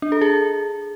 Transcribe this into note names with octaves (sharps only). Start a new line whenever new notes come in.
D4
A4
G#4